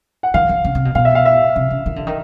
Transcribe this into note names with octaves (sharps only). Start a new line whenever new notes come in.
F#5
D#3 F5
D3
C#3
C3
B2
B2 F5
E5
F5
E5
C3
C#3
D#3
D3
D#3